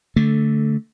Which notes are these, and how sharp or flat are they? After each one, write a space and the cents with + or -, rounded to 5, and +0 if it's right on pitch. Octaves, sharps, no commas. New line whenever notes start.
D3 -15 A3 +0